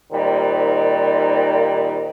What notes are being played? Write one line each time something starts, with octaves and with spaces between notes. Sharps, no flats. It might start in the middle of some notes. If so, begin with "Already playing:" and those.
A#2 D#3 G3 C4 D#4